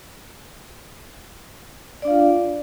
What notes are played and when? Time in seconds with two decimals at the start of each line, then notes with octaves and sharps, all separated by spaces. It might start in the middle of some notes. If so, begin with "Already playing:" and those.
2.02 D5
2.05 D4
2.08 F5
2.10 F4